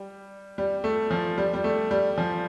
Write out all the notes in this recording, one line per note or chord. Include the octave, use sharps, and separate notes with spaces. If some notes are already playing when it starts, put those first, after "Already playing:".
Already playing: G3
G3
A3
F3
G3
G3
A3
G3
F3